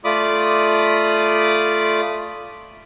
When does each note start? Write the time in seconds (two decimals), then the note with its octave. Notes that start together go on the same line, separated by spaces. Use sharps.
0.04 A3 F4 D5 B5 D6 D#6